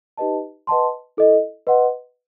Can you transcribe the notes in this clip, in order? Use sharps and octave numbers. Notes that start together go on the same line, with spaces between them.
D#4 G4 B4 D#5 A5
B4 D#5 F#5 A5 C6
E4 A4 D#5
B4 D#5 F#5 C6